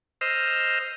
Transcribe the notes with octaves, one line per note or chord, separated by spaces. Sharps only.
C5 D#5 E6 F6